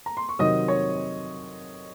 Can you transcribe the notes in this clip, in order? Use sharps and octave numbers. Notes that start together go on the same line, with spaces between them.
A#5
C6
C#6
C3 D#3 F#3 C4 D#5 D#6
C#5 C#6